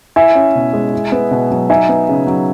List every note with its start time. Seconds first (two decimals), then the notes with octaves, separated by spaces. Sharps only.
0.16 E4 E5 G#5
0.35 C#4
0.55 B2
0.73 G#3
0.93 E4
1.12 B3
1.31 B2
1.50 F#3
1.70 D#4 E5 G#5
1.89 B3
2.08 C#3
2.27 F#3